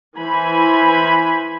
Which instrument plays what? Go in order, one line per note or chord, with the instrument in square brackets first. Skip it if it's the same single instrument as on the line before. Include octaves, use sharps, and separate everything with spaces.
[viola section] E3 C5 G#5 B5